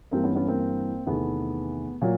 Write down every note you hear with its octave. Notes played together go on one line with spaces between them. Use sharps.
G2 E3 A#3 C4
B3 C#4
B3 C#4
A#3 C4
E2 C3 D#3 A3 B3
A#2 F#3